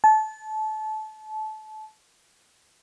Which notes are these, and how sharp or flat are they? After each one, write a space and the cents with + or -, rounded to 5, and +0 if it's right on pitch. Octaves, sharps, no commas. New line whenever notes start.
A5 -25